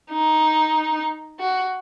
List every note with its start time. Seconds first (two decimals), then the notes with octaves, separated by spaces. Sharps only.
0.11 D#4
1.40 F#4